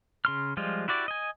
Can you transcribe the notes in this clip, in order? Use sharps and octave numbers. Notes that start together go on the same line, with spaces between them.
C#3 C6 F6
F3 G3 G#3 F4
E4 F#4 G4 D5
D#5 G#5